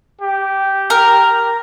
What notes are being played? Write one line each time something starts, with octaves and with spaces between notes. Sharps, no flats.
G4
A#4